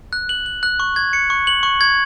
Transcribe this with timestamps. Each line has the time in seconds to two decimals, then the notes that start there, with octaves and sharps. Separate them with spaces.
0.13 F#6
0.29 F#7
0.46 F#7
0.63 F#6
0.80 C#6
0.96 G#6
1.13 C#7
1.30 C#6
1.47 F#7
1.63 C#6
1.81 G#6